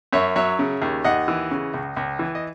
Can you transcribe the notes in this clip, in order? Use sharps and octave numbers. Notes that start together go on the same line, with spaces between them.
F#2 C#5 E5
F#3 C#5 E5
C#3
D#2
D#2 D#5 F#5
E3
C#3
C#2
C#2
E3
D#5